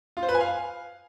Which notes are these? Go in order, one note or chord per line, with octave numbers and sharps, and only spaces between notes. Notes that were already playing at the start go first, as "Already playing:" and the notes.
F4
C5
B4
G#5
F5